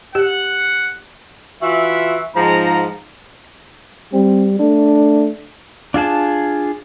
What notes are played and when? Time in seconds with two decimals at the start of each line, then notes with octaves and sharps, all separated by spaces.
0.15 G4 F#5
1.62 E3 F4 F#4 E5
2.36 G#2 F3 A#5
4.13 G3 C4
4.60 A3 D4
5.94 D4 F4 G#4 A5